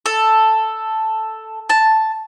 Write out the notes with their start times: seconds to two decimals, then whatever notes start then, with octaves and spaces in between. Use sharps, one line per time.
0.06 A4
1.70 A5